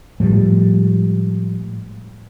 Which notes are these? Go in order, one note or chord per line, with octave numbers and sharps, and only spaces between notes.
A2 F3 G3 G#3